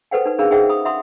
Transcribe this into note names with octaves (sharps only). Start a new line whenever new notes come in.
A4 B4 C5 F#5 G5
D#4 B4
C#4 D4 G#4 A#4 F5 B5
D#4 G#4 C5 E5 F#5 G5
B5 D#6
E5 F#5 B5 C6 D#6